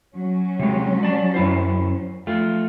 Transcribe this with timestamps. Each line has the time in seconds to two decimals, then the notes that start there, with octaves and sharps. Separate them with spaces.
0.15 F#3 C#4
0.59 C3 G#3
1.03 D5 A5
1.34 F#2 E4 C5
2.27 F3 A3 F4